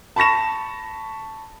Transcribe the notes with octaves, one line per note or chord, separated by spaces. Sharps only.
A5 B5 C#6 A#6 E7